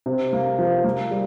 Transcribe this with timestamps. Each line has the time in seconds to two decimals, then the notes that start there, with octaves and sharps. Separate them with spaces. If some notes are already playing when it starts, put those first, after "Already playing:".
0.06 C3
0.33 A#3
0.59 F3
0.84 A#3
1.11 G3